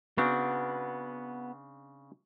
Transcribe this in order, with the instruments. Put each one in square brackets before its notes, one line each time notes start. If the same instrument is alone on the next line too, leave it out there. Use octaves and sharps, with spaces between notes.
[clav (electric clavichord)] C#3 C4 D4 [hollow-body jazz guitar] B3 F#4